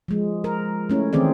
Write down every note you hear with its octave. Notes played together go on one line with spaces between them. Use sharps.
F3 G#3
A#4
A3 C#4 E4
D#3 E3 C4 G#4 D5